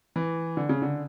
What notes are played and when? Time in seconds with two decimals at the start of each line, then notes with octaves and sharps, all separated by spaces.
0.16 E3
0.57 D3
0.69 C#3
0.82 D3